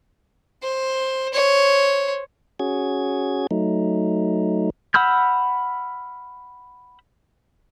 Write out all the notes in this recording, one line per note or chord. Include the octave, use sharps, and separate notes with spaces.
C5
C5 C#5
C#4 F#4 G#4 G#6
F#3 A3 D#4
F#5 B5 E6 F6 G6